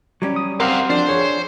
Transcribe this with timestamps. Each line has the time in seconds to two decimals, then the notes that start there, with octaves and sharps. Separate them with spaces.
0.22 F#3 G3 C#4
0.36 D#6
0.60 C4 G4 A#4 F5 F#5 F6
0.90 F3 D4 C5
1.09 G#4 C#5